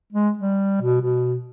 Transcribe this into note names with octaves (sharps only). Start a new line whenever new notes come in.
G#3
G3
B2
B2